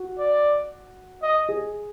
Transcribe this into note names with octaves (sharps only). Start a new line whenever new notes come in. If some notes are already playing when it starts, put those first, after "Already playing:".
Already playing: F#4
D5
D#5
G#4